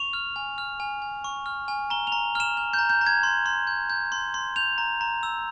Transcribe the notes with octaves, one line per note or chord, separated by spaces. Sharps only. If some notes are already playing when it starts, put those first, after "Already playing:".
Already playing: C#6 F7
F6
G#5
F6
G#5
G#5
C#6
F6
G#5
A#5 G7
F7
A#5
F6 E7
F6
G6
A#5
G6
A#5
G#6
C6
C6
G6
G6
C6
C6
G6 F7
A#5
A#5
E6